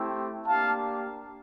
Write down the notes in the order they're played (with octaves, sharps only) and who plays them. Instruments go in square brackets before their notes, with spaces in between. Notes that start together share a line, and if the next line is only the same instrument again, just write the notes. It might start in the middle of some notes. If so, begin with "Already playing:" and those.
Already playing: [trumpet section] A3 C4 E4 G4
A#3 D4 G4 F5 A5